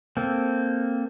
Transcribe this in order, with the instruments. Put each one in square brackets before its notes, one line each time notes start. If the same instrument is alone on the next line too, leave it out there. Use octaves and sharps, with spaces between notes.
[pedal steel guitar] A#3 C4 A4